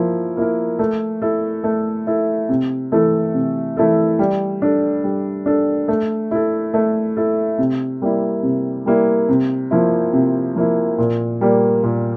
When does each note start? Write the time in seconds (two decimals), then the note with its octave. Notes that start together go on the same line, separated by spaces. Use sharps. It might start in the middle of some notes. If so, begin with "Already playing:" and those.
Already playing: F3 A#3 E4
0.37 A#3 E4 A#4
0.79 A3
1.22 E4 A4
1.64 A3
2.07 E4 A4
2.49 C3
2.92 E3 A3 E4 A4
3.34 C3
3.77 E3 A3 E4 A4
4.19 G3
4.62 D4 A4
5.04 G3
5.46 D4 A4
5.88 A3
6.31 E4 A4
6.74 A3
7.17 E4 A4
7.58 C3
8.02 G3 A#3 E4
8.43 C3
8.86 G3 A#3 E4
9.29 C3
9.71 F3 A#3 E4
10.13 C3
10.56 F3 A#3 E4
10.98 A#2
11.41 G3 A#3
11.83 A#2